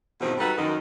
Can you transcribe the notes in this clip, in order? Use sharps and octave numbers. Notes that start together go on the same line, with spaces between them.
E2 G2 B2 D#3 F3 C4
G3 D#4 F#4 A4 B4
F#2 D#3